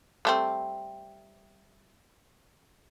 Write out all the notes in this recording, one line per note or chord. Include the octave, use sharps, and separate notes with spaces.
G3 A3 C4